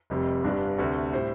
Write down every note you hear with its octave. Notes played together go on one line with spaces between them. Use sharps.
F1 F2 C3 G3
G1 G2 G3 D4
D2 C3 A3
A2 G3 C5